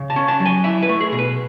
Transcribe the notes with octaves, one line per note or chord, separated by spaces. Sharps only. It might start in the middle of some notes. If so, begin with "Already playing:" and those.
Already playing: C#3
A5
C#4
A5
F#3
G#5
E4 E5
B4
A3
G#4
B2
B4